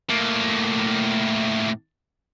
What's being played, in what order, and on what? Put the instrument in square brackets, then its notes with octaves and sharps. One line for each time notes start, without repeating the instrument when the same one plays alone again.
[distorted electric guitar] A2 A#3